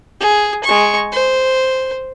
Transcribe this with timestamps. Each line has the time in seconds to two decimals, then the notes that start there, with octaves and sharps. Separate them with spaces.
0.20 G#4
0.64 G#3 C#6
1.12 C5